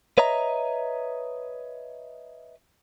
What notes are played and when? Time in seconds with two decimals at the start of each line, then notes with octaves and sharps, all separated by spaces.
0.18 B4 C#5 D#5 E5 A#5